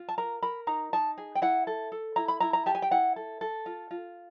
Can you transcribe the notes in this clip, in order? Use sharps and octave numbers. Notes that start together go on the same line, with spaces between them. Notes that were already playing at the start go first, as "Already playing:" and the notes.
Already playing: F4
A5
A#4 A#5
A#4 B5
D#4 A#5
D#4 A5
G#4
G5
E4 F#5
A4
A4
E4 A#5
B5
E4 A#5
A#5
G4 A5
G#5
G5
E4 F#5
A4
A4
F4
F4